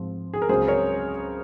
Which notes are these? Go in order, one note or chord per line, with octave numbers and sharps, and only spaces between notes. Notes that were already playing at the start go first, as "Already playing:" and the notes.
Already playing: G#2 F3 C4
G#4
A#4
C#2 C#3 F#3 C4 G#4 C5
A#4 C#5